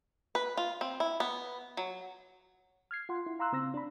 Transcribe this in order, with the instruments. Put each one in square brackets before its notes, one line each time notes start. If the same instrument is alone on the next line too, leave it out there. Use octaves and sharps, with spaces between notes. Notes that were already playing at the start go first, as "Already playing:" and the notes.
[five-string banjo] B4
F4
C4
E4
B3
F#3
[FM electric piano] F6 G#6 C7
F4 F#5 C6
E4
F5 A#5 C6 E6 F#6
C#3 C4 E6 A#6
D4 B5